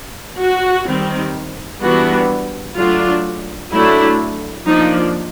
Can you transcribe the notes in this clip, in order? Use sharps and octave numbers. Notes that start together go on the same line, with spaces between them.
F#4
D#3 G3 C4
E3 G3 B3 D4 F#4
F#3 A3 D4 F4
F#3 A3 D4 E4
F3 A#3 D4 D#4